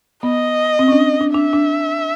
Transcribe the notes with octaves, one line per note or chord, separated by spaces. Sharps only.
B3 D#5
C4
C#4
D4
D4
D4 E5
D4